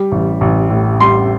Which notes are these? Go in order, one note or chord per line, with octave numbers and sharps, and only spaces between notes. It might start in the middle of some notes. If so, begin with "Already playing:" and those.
Already playing: G3
A1
A1
A2
G3 C6